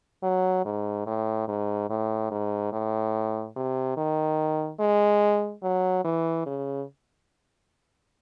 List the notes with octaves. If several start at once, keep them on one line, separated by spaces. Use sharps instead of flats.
F#3
G#2
A2
G#2
A2
G#2
A2
C3
D#3
G#3
F#3
E3
C#3